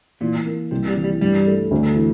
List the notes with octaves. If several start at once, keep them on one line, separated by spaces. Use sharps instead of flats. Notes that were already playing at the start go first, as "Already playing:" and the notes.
A#2 E3
A#3
C2 C3
G3
E3
G3
G2 G3
A3
D2
E3